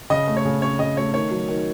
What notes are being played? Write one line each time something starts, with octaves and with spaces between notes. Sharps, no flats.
C#3 D#5
A3
C#5
C#3
C#4 C#5
C#3 D#5
A3 C#5
D#3 C#5
F#3
D#3